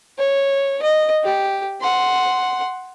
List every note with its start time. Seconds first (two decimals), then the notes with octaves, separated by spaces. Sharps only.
0.19 C#5
0.83 D#5
1.24 G4
1.81 F#5 C6